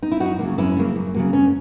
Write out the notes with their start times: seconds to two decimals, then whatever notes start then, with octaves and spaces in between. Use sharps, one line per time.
0.03 D#4
0.12 E4
0.20 F#2 D#4 F#4
0.39 C#3 F#3 A#3
0.58 F#2 C#4 E4
0.77 C#3 F#3 A#3
0.96 F#2
1.15 C#3 F#3 A#3
1.33 F#2 C#4